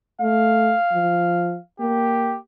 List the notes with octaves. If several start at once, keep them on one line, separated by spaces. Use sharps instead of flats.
A3 F5
F3
A#3 G4